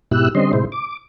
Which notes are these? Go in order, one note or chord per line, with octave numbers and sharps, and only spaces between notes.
G#2 B2 E4 G4 E6 F#6
D3 G3 C4 C#4 D#5 C6
A2 C3 G#3 E4 C5
D6